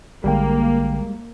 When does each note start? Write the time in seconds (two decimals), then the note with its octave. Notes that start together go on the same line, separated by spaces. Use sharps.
0.24 A#1 D3 G3 G#3 A#3 G5